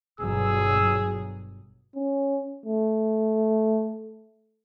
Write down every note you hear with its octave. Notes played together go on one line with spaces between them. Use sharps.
G1 B2 F#3 G#4 E6
C#4
A3